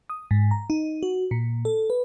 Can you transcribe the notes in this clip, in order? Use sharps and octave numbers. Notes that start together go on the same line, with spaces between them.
D#6
G#2
A#5
D#4
F#4
A#2
A4
B4